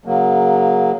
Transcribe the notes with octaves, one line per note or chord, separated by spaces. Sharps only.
C#3 F#3 A#3